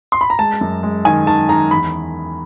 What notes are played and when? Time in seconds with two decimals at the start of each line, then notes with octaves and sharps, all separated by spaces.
0.12 C6
0.21 B5
0.30 A#5
0.39 G#3 A5
0.61 F#2
0.83 G#3
1.05 D#3 G#5
1.27 D#3 A5
1.49 D#3 A#5
1.71 E2 B5